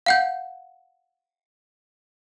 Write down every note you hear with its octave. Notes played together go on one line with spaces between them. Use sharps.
F5 F#5 G6